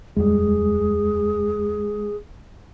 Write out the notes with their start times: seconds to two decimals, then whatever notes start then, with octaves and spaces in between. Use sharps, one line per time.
0.17 D#1 F2 G3 G#3 G#4